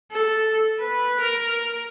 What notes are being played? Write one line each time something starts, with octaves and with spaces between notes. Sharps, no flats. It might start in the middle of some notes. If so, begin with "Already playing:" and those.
A4
B4
A#4